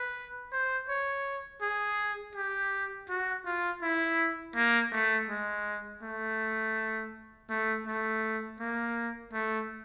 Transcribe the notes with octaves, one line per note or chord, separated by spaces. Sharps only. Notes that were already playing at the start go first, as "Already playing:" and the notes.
Already playing: B4
C5
C#5
G#4
G4
F#4
F4
E4
A#3
A3
G#3
A3
A3
A3
A#3
A3